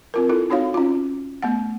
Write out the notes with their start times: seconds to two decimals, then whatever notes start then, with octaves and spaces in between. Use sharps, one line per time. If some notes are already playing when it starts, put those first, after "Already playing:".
0.14 C4 F4 A#4
0.29 E4 F4 A4
0.50 C4 D#4 F#4 C#5 F5
0.74 C#4 F4
1.42 A3 B3 F#5